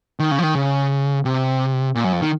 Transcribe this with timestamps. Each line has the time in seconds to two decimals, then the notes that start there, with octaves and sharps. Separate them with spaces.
0.19 D#3
0.31 C#3
0.39 F3
0.43 D#3
0.55 C#3
1.25 C3
1.95 A#2
2.04 F#2
2.13 F2
2.22 D#3